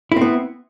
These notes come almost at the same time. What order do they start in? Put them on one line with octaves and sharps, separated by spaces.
E4 C4 B3